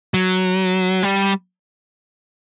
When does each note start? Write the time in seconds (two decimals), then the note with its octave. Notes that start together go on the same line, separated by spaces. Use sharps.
0.14 F#3
1.03 G3